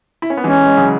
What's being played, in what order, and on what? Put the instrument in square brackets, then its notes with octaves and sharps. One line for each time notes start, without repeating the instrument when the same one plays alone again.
[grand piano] E4
C#4
B3
[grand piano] E3 G#3 [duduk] C#4
[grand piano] G#3
C#3 F#3